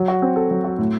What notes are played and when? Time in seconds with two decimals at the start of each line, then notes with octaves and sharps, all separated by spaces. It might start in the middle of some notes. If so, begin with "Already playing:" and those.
Already playing: F#3
0.08 F#4
0.22 C4
0.36 A4
0.51 F#3
0.64 F#4
0.78 A2